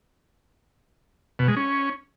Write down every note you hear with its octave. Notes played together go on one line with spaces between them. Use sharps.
B2
G#3
C#4